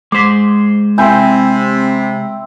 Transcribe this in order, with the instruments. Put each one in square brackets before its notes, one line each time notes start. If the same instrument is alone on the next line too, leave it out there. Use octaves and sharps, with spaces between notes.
[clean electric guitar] G#3 C5 [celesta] D6 B6
[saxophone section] C3 [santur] C4 E4 [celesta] G#5 G6